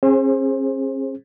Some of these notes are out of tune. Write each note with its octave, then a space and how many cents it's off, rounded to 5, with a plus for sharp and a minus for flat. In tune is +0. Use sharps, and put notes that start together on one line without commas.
C#4 -45 G#4 -10 C5 +30